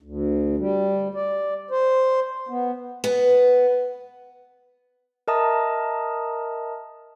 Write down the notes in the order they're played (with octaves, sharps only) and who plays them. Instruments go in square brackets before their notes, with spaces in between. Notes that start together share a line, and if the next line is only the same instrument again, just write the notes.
[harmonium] D2
G3
D5
C5
B3
[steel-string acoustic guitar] B3
[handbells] A#4 D#5 E5 A5 A#5 D#6